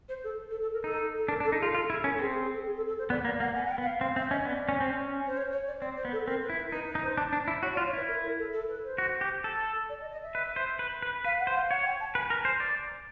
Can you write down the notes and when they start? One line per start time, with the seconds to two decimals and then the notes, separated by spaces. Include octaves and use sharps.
0.09 C5
0.23 A4
0.50 A4
0.61 A4
0.73 A#4
0.84 D#4 A4
1.18 A4
1.28 D4 A#4
1.40 D4
1.44 A4
1.52 D#4
1.59 G#4
1.62 F4
1.74 F4 A4
1.90 E4 A4
2.04 C#4 A#4
2.14 A4
2.19 C4 G#4
2.31 G#4
2.43 G#4
2.54 A4
2.65 G#4
2.77 A4
2.87 A4
2.98 C5
3.10 B3 D5
3.25 A#3 D5
3.40 A#3 F#5
3.55 B3 G#5
3.65 F#5
3.71 G5
3.78 B3
3.82 F#5
3.85 F5
4.01 C4 F5
4.16 C4 E5
4.31 C#4 D#5
4.45 B3 D5
4.69 C#4
4.80 C4
4.93 C#4
5.26 C5
5.37 C#5
5.52 C#5
5.67 D5
5.81 C4 D5
5.97 C5
6.05 B3
6.12 A4
6.27 C4 A#4
6.42 B4
6.50 E4
6.57 B4
6.72 D#4 B4
6.87 B4
6.95 D#4
7.02 C5
7.17 D4
7.33 D4
7.48 E4
7.62 F#4 C#5
7.74 D5
7.77 F4
7.85 C#5
7.93 E4 B4
8.08 A#4
8.23 A#4
8.38 A4
8.53 A4
8.69 B4
8.84 C5
8.98 F#4
9.21 G4
9.44 A4
9.89 D5
10.00 D#5
10.12 D#5
10.23 E5
10.35 B4
10.56 C5
10.79 B4
11.02 B4
11.24 B4 F5
11.40 F#5
11.47 C5
11.55 F5
11.70 C#5 F#5
11.85 G5
12.00 A5
12.15 B4 G#5
12.30 A#4
12.45 C5
12.60 D5